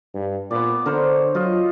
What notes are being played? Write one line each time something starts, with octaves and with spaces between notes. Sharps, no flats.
G2
A#2 B3 D5
D3 A#4 C5 C#5
F#3 F4 D#5